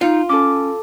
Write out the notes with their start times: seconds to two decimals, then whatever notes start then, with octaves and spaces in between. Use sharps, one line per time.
0.01 D#4 F4
0.29 C#4 A4 D6